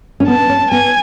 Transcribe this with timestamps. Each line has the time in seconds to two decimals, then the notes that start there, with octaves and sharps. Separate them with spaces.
0.20 C#4
0.28 B3 A5
0.49 C#4
0.72 B3 G#5